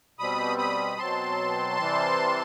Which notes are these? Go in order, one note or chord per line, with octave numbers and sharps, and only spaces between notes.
B2 G3 C4 B5 D#6
B5 D#6
B2 F#3 C4 A5 C6
C3 E3 G3 C4